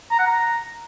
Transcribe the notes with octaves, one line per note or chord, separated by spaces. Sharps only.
A#5
F#5
A#5